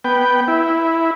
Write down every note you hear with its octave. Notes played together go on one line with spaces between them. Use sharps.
B3 G5
E4